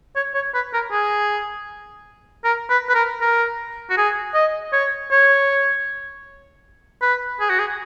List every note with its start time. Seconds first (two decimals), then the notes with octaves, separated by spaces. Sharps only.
0.16 C#5
0.34 C#5
0.54 B4
0.73 A#4
0.91 G#4
2.44 A#4
2.70 B4
2.89 B4
2.95 A#4
3.21 A#4
3.90 F#4
3.97 G#4
4.34 D#5
4.73 C#5
5.11 C#5
7.02 B4
7.40 G#4
7.49 F#4
7.59 G#4